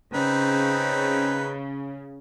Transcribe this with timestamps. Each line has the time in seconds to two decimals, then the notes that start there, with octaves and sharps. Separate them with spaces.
0.14 C#3 C4 D#4 B4